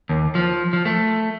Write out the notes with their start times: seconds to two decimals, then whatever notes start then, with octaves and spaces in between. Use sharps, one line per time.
0.09 D#2
0.35 F3
0.73 F3
0.85 A3